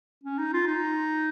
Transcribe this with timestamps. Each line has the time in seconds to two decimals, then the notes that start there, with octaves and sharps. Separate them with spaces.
0.24 C#4
0.38 D#4
0.53 F4
0.67 D#4